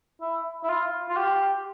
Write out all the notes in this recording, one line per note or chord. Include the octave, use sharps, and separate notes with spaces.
E4
E4
F4
F4
G4